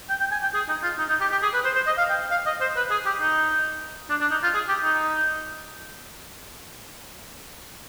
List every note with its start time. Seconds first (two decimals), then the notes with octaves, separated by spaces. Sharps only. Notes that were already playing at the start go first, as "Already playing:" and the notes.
0.09 G5
0.20 G5
0.32 G#5
0.42 G5
0.54 G#4
0.68 D#4
0.83 F4
0.98 D#4
1.09 D#4
1.21 G4
1.32 G4
1.42 G#4
1.54 B4
1.65 C5
1.75 C5
1.87 D#5
1.98 F5
2.09 G5
2.31 F5
2.46 D#5
2.61 C5
2.76 B4
2.91 G#4
3.06 G4
3.21 D#4
4.10 D4
4.21 D4
4.31 D#4
4.43 F4
4.54 G#4
4.69 G4
4.84 D#4